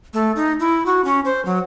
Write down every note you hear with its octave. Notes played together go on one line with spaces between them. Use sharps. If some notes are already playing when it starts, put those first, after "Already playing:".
A3
D#4
E4
F#4
C#4
C5
F#3